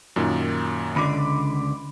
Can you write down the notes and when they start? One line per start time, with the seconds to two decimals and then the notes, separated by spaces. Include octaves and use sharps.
0.16 F#2 A#2 D#3
0.96 C#2 D3 B5 D6